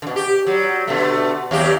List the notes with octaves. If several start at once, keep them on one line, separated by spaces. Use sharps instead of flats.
B2 D3
G4
F#3 G3
B2 D3 A3
D#2 F#3 G4